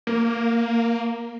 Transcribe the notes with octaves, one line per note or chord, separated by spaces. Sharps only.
A#3